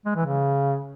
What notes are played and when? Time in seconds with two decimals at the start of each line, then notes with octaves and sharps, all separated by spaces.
0.05 G#3
0.16 E3
0.26 C#3